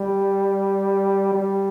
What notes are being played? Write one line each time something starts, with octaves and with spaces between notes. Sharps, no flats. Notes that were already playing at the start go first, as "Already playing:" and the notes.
Already playing: G3
G3